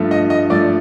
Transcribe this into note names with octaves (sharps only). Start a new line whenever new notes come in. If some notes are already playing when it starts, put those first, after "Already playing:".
Already playing: G2 F3 A3
D#5
D#5
G2 F3 A3 D5